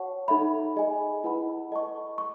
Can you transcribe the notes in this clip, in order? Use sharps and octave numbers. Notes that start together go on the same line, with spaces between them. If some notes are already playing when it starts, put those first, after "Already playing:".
Already playing: F#4 C#5 F#5 A5 C#6
D#4 A4 E5 B5
G#4 D#5 G#5
E4 B4 F#5 B5
A4 D#5 A5 C#6
C#6